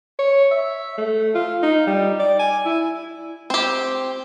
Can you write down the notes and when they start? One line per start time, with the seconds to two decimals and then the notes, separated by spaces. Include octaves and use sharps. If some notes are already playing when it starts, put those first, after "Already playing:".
0.19 C#5
0.51 E5
0.98 A3
1.35 F4
1.63 D#4
1.87 G3
2.19 D5
2.39 G#5
2.65 E4
3.50 C4 G4